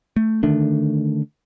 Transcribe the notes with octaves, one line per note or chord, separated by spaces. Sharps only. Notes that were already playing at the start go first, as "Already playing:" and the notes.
A3
D3 D#3 A3 D4